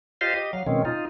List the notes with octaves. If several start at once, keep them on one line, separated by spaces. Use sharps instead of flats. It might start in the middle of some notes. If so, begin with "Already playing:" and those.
F4 G4 C5 D#5 F5
G4 D#5
F#3 F5
B2 D#3 G#3 C4 C#4
D#4 F4